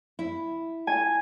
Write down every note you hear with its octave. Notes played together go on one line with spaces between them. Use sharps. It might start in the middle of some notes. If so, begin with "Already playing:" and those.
E4
G#5